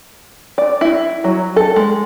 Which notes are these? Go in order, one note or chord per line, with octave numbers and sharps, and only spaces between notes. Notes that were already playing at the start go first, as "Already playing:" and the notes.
D5
E4
F#3
A4
G#3